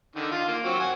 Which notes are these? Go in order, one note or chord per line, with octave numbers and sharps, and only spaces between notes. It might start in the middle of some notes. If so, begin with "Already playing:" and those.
D3 D#3
F4
A#3
F#3 C4
F#5 G#5